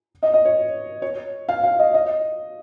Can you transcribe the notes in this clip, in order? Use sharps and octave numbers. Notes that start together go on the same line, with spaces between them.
D#5
D#5
C#5
C#5
F5
F5
D#5
D#5